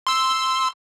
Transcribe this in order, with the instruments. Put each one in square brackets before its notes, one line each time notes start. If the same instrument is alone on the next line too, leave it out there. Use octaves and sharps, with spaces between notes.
[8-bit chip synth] C6 E6